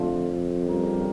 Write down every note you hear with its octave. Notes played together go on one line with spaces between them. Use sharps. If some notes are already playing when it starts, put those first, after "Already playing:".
Already playing: F2 D3 A3 D4 F4 A4
C#3 G3 D4 G4 A#4